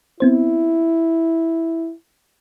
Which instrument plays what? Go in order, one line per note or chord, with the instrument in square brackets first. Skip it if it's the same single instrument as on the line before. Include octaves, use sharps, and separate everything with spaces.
[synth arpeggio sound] B3 C4 C5 [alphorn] E4